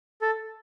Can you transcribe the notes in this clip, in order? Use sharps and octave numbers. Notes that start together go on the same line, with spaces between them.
A4